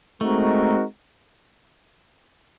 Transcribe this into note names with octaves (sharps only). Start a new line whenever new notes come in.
G#3 A3 C4 D#4 F#4 A#4